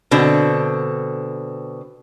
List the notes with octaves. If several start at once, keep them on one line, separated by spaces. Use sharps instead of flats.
B2 D3 C4